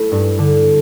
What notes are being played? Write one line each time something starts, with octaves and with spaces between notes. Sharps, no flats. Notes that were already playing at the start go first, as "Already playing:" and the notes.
Already playing: A3 E4
G2
D3